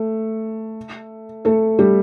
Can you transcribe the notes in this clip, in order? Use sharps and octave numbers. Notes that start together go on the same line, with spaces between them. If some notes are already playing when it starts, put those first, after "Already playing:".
Already playing: A3
A3 A4
G3 G4